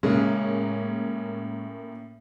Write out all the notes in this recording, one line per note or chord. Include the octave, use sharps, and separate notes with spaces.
A2 C#3 G#3 A#3 C#4